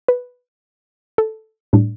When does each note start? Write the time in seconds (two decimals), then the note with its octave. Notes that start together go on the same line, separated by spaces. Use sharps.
0.08 B4
1.18 A4
1.73 A2 G3 D4